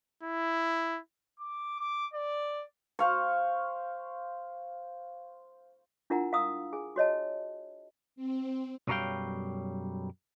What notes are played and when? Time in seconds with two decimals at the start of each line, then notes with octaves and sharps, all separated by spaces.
0.23 E4
1.40 D6
1.80 D6
2.13 D5
2.99 C5 F5 C#6
6.10 D4 E4 F4 A#4 F#5 A#5
6.33 F5 A#5 D#6 E6
6.73 G#4 G#5
6.96 F#4 C#5 D#5 A5
8.16 C4
8.88 B1 F#2 F#3 G3 F5 G5